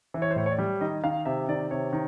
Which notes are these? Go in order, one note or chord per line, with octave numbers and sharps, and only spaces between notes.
E3
C#5
C5
A2 C#5
C#5
D5
G3
D#3 D#5
D#3 F5
C3 E5
D#3 D5
C3 C#5
D#3